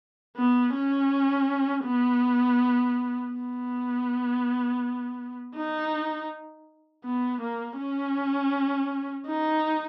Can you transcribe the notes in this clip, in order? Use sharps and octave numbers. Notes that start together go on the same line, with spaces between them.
B3
C#4
B3
B3
D#4
B3
A#3
C#4
D#4